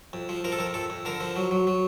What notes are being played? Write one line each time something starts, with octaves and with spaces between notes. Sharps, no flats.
F2
F3
F3 A#4
A4
F2 A#4
F2 A4
F2
D3 A#4
F3
F#3
F#3
F#3